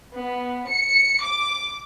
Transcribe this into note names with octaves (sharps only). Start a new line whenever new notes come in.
B3
C#7
D6